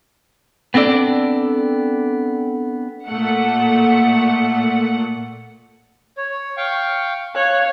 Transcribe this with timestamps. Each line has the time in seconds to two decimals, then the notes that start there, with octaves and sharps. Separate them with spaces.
0.74 B3 C4 D4 A4 D5
3.06 A#2 A3 F#5
6.18 C#5
6.57 F5 G5 C#6
7.35 C#5 F5 F#6